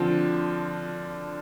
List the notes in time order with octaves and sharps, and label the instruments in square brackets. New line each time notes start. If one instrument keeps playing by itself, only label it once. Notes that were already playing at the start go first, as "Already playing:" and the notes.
Already playing: [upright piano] D3 F3 C4 F4